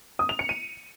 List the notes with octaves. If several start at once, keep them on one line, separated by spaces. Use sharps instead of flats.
D#6
F7
C#7
D#7